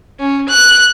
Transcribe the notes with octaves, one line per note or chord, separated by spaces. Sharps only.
C#4
F#6